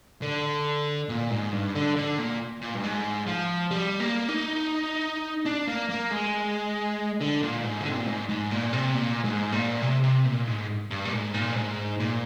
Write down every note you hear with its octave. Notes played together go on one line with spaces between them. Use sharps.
D3
A#2
G#2
G2
D3
D3
A#2
A#2
G2
G#2
F3
G3
A#3
D#4
D4
A#3
A#3
G#3
D3
A#2
G#2
D3
C3
A#2
G#2
G#2
A#2
C3
A#2
G#2
A#2
C3
C3
A#2
G#2
G2
A#2
G#2
A#2
G#2
A#2